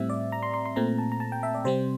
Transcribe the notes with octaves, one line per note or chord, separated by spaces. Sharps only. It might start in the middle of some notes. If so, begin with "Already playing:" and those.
Already playing: A2 G3 C4 E5
D5
A#5
C6
C6
C6
A#2 A3 C4 A#5
A5
A#5
A5
G5
E5
D5
C3 G3 C4 C5